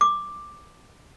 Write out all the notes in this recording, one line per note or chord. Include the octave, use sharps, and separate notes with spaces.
D6